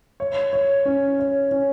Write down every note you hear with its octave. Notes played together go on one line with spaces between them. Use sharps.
C#5
C#5
C#4
C#5
C#4